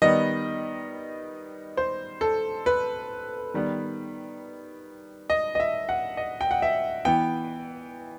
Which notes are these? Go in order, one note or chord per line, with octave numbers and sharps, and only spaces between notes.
D#3 G3 B3 D#5
C5
A4
B4
D#3 G3 B3
D#5
D#5
E5
F#5
D#5
G5
F#5
E5
E3 B3 G5